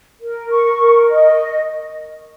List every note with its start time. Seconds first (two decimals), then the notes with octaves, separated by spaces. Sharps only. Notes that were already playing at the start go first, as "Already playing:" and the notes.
0.20 A#4
0.50 C#6
0.79 A#4
1.09 D#5